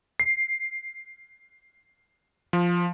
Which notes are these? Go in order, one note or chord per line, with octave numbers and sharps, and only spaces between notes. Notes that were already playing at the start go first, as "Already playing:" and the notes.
C7
F3